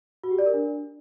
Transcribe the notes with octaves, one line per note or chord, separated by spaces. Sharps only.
F#4
G4
D5
A#4
D4